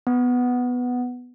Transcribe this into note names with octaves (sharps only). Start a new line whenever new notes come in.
B3